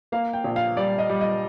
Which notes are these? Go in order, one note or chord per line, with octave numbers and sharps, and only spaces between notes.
A#3 F5
G5
A#1
F5
G3 D5
D#5
G3
D#5